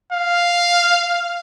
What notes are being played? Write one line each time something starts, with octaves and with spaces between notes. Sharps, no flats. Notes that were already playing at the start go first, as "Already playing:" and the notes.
F5